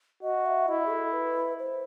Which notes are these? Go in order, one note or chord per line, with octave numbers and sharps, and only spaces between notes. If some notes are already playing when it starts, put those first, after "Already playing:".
F#4 D#5
E5
E4 D#5
G#4
A4
B4
C5